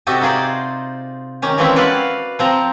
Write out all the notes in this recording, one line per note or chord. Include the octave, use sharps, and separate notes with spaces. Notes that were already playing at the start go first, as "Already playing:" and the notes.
C3 F#4 G4 A4 D#5
D#4 F4 G#4 C5 D5
D#3 C#4 G4
E3 F3 G#3 C4 C#4 E4
F#4 B4 D5 F5 F#5
F3 C4 A#5